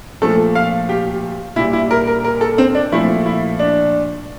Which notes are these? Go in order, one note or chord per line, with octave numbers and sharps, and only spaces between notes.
A#2 F3 A3 A4
F5
G4
A#2 G3 E4
E4
A#4
A#4
A#4
A4
C4
D4
A#2 F3 A3 E4
E4
D4